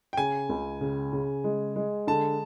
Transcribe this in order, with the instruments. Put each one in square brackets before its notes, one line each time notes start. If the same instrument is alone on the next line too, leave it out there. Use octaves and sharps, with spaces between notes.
[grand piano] G5
[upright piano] C#3 [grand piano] G#5
[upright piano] C#2
C#3
C#3
G#3
G#3
[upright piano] D3 [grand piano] A5